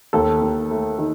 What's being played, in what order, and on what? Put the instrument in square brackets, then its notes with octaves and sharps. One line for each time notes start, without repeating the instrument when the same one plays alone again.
[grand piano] D#2 A4
D#2
A3
D#3